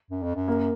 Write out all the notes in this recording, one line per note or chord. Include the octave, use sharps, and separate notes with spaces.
F#2
F2
F#2
A#3